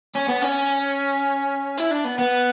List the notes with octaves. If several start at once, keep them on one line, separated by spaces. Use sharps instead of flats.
C#4
B3
C#4
E4
D4
B3
B3